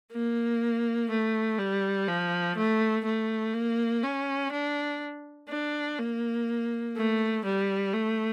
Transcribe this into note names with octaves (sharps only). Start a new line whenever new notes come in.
A#3
A3
G3
F3
A3
A3
A#3
C#4
D4
D4
A#3
A3
G3
A3